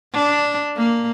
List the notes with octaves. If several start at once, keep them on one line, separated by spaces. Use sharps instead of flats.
D4
A#3